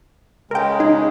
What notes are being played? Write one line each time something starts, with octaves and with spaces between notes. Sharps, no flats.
C#3 G#3 A#4 G5
D#4 G#4